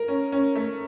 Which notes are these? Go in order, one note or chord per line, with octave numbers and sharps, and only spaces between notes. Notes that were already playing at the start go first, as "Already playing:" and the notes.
Already playing: A#4
C#4
C#4
A3